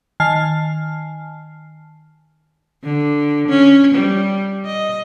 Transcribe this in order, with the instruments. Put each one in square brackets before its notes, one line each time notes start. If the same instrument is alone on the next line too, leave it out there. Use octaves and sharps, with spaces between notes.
[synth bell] D#3 G#5 A5 F6 C7
[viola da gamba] D3
C#4
G3
D#5